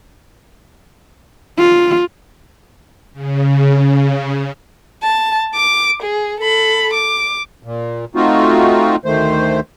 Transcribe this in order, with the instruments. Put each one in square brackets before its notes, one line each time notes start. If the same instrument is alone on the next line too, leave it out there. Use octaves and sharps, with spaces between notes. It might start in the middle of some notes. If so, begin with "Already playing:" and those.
[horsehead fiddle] F4
[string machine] C#3
[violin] A5
D6
G#4
A4 B5
D6
[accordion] A#2
A3 C4 D#4 F4 F#4
D2 D#3 A3 C5